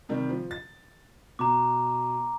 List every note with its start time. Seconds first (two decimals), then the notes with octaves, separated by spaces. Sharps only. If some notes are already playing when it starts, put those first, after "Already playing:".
0.09 C3 D#3 G3
0.29 F3
0.51 A6
1.39 B2 A#5 D6